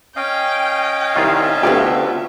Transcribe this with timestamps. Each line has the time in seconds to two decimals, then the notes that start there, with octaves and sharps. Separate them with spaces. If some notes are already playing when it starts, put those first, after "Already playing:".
0.16 C#4 D#5 F5 G5
1.16 C2 D#3 F4 E5
1.63 D2 B3 F4 G4